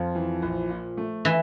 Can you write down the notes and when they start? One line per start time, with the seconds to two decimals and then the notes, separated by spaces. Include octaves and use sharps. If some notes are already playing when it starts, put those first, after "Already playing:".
Already playing: F2 F3
0.15 E3
0.42 A#1
0.70 A#2
0.97 A3
1.25 E3